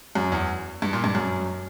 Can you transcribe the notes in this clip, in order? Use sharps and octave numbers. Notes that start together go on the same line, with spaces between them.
F#2
E2
G2
A#2
G2
F#2